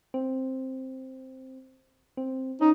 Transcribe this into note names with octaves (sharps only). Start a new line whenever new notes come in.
C4
C4
C#4 D#4